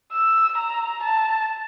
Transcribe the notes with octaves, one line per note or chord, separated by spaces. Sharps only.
E6
A#5
A5